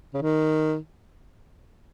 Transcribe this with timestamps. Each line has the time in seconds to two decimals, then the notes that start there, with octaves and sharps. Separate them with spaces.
0.14 C#3
0.22 D#3